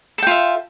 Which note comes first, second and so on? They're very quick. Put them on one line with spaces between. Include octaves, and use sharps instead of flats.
A4 G5 F4 E5